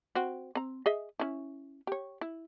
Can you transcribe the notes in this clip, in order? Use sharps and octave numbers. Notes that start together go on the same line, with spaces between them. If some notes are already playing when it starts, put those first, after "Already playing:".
C4 F#4
C4 A#5
G#4 D#5 E5
C#4 E4
G4 C#5
E4